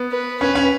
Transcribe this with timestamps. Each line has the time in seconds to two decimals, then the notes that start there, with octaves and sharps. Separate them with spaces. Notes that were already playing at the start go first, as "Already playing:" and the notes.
Already playing: B3
0.12 B4
0.41 C#4 B4
0.55 C#4